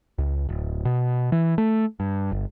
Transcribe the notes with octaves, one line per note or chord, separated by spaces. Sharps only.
C#2
D1
B2
E3
A3
G2
G1